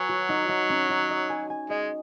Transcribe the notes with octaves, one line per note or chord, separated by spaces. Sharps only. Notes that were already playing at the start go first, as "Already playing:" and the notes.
Already playing: F#3 B4 C#5 G#5
F#4
D#4
D#4
C#4
D#4
D#5
G#5
G#5
G#3 D#5